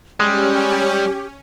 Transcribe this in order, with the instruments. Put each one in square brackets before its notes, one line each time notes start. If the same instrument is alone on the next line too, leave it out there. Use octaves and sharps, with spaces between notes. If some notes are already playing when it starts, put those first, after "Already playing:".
[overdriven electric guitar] G3 [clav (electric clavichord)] G#3 [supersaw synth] C#4 [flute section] G4